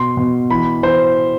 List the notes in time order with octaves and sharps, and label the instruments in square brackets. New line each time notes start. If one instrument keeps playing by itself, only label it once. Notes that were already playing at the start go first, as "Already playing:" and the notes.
Already playing: [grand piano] B2 C6
B2
E3 B5
E3 C5